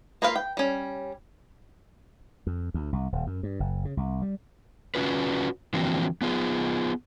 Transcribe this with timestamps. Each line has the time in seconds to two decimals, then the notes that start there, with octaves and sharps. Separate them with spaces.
0.22 A#3 F4 B4 F5
0.36 G5
0.57 G3 C#4
2.47 F2
2.74 D2
2.93 C2
3.12 D#1
3.27 F#2
3.43 G2
3.60 F#1
3.85 C#3
3.97 C2
4.22 G3
4.95 C#4 F4 F#4 B4
5.74 D3 E3 F3 A#3 C4 F#4
6.22 B3 F4 G#4